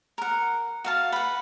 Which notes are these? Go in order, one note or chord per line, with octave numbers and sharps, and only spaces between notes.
A#4 F#5
F#4 F5 A5
B4 F#5